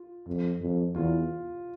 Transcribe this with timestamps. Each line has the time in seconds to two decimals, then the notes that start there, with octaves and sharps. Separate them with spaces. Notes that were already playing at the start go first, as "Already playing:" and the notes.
Already playing: F4
0.27 F2
0.61 F2
0.95 E2 F4